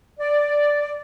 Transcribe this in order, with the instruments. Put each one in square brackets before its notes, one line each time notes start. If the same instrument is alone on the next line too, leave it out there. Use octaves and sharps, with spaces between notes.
[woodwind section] D5